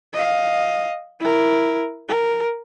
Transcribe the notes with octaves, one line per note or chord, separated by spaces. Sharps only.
D#5 F5
E4 A#4
A#4